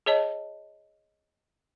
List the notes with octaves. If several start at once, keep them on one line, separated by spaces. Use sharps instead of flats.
G#4 C#5 D#5 A5